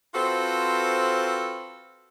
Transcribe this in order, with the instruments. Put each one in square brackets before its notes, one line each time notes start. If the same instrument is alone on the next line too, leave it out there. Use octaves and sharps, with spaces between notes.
[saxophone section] C4 F4 F#4 A4 B4 C5